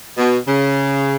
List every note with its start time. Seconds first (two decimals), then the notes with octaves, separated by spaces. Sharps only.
0.17 B2
0.47 C#3